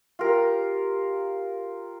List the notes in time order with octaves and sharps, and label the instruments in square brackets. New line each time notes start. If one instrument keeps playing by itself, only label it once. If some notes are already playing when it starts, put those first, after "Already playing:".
[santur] F4 G4 A#4